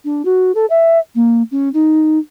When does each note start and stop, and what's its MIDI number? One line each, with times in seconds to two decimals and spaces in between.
0.05 0.25 62
0.25 0.52 66
0.55 0.66 69
0.70 0.99 76
1.15 1.43 58
1.51 1.69 61
1.74 2.18 63